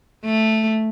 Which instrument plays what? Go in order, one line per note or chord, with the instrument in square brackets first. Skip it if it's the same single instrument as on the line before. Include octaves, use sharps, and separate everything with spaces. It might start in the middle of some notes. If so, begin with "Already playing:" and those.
[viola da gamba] A3